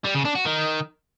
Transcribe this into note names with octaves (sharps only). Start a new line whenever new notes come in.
G3
C#3
D4
F#4
D#3